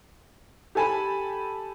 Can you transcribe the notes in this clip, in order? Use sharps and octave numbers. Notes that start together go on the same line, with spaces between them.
G4 A4 G#5 A5 B5